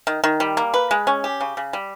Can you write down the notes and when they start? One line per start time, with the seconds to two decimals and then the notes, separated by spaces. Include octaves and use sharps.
0.07 D#3
0.24 D#3
0.40 G3
0.57 A#3
0.74 B4
0.91 G#3
1.07 C#4
1.24 G4
1.40 C#3
1.57 C#3
1.73 G3